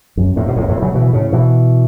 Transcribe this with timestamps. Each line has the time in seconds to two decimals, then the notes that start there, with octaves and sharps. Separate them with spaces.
0.17 F#2
0.36 E2 A2
0.47 B2
0.56 E2 A2
0.69 E2 A2
0.82 C#3 F#3
0.94 B2 E3
1.13 A2 C#3
1.32 B2 E3